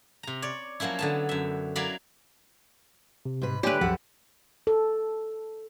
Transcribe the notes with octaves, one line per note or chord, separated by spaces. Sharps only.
C3 A#5
C#5 D5
F3 F#3 A#3 C#4 E4
D3 B3 A5
F#2 E5
F#3 E4 A#4 D5 F5 B5
C3
G#2 B4
D3 A3 G4 B4 C#5 D5 G#5
C2 F#2 F3 A4 F#5
A4